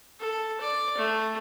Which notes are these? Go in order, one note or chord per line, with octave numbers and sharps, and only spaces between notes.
A4
D5
A3